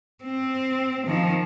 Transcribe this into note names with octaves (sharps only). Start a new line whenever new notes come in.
C4
D#3 F3